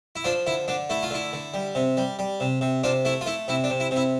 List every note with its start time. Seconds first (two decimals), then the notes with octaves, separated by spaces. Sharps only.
0.16 E4
0.24 F3 D4 F4
0.47 D3 E4
0.68 D3 D4
0.90 A3 E4
1.03 F4
1.11 D3 E4
1.33 D3
1.54 G3
1.75 C3
1.97 G3
2.19 G3
2.40 C3
2.61 C3
2.83 C3 D4 F4
3.05 A3 E4
3.21 F4
3.26 A3 E4
3.48 C3 E4
3.64 D4
3.70 C3
3.80 E4
3.91 C3
3.96 E4